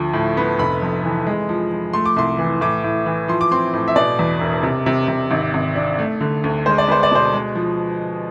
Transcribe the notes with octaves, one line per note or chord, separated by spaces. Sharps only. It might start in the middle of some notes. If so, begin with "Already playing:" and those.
Already playing: D2 F3
A2
B3
F1 B5
F2
E3
G#3
F3
F3
A3 C6
D6
C2 C6
E3
A2 D6
A2
E3
F3 C6
D6
C4 C6
A2
E5
B2 D5
E2
E1
C3
C3
C3
G#1
G#1
D4
A3
D3
D2
G#3 C5
D5
B3 C5
D5
B2 C5
G#3
F3